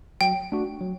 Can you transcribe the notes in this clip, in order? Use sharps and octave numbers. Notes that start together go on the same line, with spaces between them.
F#3 G5
A3 D4 F#4
F#3